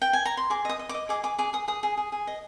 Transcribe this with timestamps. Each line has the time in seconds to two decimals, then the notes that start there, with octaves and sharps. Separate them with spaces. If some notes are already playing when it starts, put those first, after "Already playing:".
0.02 G5
0.13 G#5
0.25 A#5
0.37 C6
0.50 G#4 D6
0.65 D#5 D#6
0.79 D#5
0.89 D6
0.94 D#5
1.09 G#4 D6
1.23 G#4 D6
1.38 G#4 D6
1.53 G#4 D#6
1.68 G#4 D#6
1.83 G#4
1.97 G#4
2.12 G#4
2.27 D#5